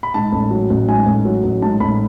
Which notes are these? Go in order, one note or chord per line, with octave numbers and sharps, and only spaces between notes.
B5
G#2 A5
A1
F#3
A1
G#2 G#5
A1
F#3
A1
G#2 A5
A1 B5